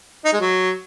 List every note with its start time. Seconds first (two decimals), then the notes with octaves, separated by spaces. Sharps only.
0.25 D#4
0.33 G#3
0.40 F#3